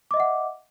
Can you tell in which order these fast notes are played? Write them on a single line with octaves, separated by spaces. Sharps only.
D6 D#5 E5 F#5